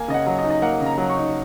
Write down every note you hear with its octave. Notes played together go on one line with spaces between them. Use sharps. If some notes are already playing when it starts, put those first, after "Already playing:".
Already playing: A#3 G#5
C#3 D#5
F#5
F#3
D#5
D#4
D#5
A#3 F#5
C#3
A#5
F#3
C#6
D#4